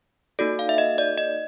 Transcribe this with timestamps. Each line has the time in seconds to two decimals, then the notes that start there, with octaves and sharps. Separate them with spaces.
0.39 A#3 D#4 F#4 A4 D5
0.59 F5
0.69 E5
0.78 D#5
0.98 D5
1.18 D#5